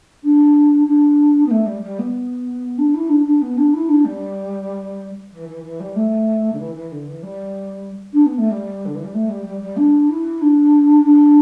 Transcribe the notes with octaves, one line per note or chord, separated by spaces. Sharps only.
D4
D4
B3
A3
G3
G3
B3
D4
E4
D4
D4
B3
D4
E4
D4
G3
E3
E3
E3
G3
A3
D3
E3
E3
D3
E3
G3
D4
B3
A3
G3
D3
E3
G3
A3
G3
G3
G3
D4
E4
D4
D4